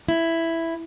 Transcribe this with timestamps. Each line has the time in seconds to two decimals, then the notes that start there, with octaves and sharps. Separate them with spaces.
0.09 E4